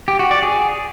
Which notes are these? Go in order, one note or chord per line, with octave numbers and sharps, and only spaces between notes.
G4
F#4
D5
G#4